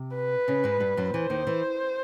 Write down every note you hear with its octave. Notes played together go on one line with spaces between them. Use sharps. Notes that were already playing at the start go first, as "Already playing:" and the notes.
Already playing: C3
B4
C#3 C#4
G#2 G#3
G2 G3
F#2 F#3
E2 E3 C5
D#2 D#3
E3